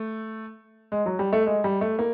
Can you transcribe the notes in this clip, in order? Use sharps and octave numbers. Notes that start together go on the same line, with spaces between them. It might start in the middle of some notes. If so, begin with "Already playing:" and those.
Already playing: A3
G#3
F#3
G3
A3
G#3
G3
A3
A#3